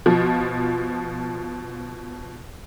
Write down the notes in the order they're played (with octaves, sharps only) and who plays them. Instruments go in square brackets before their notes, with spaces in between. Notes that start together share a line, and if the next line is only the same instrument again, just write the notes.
[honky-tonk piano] B2 F3